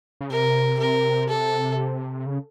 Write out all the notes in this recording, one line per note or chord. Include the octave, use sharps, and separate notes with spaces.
C#3
C3 A#4
A#4
A4
C#3